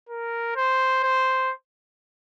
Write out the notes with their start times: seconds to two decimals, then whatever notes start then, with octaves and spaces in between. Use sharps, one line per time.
0.09 A#4
0.56 C5
1.04 C5